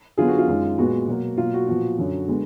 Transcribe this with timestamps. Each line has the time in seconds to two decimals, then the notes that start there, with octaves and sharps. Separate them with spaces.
0.17 D3 F#3 B3 F4 G#4
0.28 F#4
0.38 F4
0.48 F#2 D#3 G#3
0.78 A#2 G#3 B3 F#4
1.08 B2 F#3 A#3
1.37 B2 F#3 A#3 F4
1.53 F#4
1.67 A#2 F3 B3 F#4
1.98 F#2 D3 F#3
2.28 D3 G#3 B3